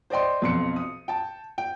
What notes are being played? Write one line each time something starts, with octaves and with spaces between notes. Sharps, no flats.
C5 D5 D#5 G5 C6
B1 F2 C6 C#7
D#6
G5 A5
G5